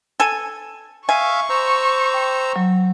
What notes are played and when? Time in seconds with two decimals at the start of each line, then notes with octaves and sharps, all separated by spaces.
0.20 A4 G#5
1.09 E5 F5 G#5 C#6
1.50 C5 A#5 E6
2.14 G5
2.56 F#3